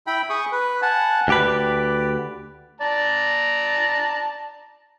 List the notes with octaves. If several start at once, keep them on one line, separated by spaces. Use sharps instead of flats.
E4 G5 B5
G#4 C#6 D#6
B4
F#5 G#5 A5
D2 G4 B4 D5
D5 A5 A#5